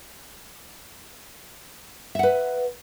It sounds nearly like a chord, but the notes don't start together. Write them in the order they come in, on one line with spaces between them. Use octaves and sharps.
E5 F#5 B4